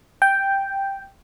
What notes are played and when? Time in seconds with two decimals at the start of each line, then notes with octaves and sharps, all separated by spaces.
0.22 G5